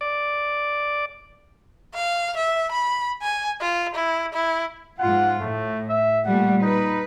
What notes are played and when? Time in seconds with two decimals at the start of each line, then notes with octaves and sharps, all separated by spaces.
0.01 D5
1.95 F5
2.36 E5
2.72 B5
3.22 G#5
3.61 F4
3.95 E4
4.34 E4
4.99 G#2 F4 F#5
5.41 A2 A3
5.89 E5
6.25 A#2 G3 A3 F#5
6.62 D#4 B4